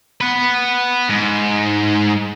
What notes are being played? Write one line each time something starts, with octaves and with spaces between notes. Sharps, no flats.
B4 F#5
G#2